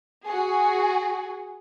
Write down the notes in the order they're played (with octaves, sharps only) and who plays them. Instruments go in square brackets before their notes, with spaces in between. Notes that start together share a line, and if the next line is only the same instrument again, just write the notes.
[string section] F#4 G#4